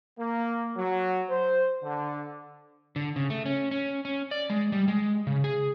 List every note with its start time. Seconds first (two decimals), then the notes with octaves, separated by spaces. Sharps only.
0.20 A#3
0.77 F#3
1.30 C5
1.83 D3
2.96 D3
3.16 C#3
3.30 A3
3.46 C#4
3.71 C#4
4.05 C#4
4.31 D5
4.50 G#3
4.72 G3
4.88 G#3
5.27 C#3
5.44 G#4